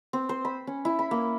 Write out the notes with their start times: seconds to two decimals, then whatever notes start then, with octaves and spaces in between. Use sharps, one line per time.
0.13 C4
0.29 C5
0.45 B5
0.67 C#4
0.85 E4
0.99 B5
1.11 A#3